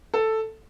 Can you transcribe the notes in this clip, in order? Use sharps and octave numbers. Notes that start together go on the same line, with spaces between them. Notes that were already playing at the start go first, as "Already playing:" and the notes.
A4